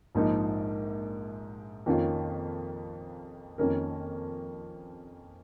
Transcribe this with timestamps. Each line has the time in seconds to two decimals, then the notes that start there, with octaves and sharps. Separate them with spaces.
0.15 A#1 G#2 F3 A#3 D#4
1.86 F2 D#3 A#3 C#4 F4
3.58 F2 D#3 A#3 C#4 A#4